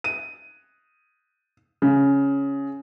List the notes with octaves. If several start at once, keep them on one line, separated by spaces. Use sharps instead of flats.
D#7
C#3